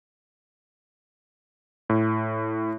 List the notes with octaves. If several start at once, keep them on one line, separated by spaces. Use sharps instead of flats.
A2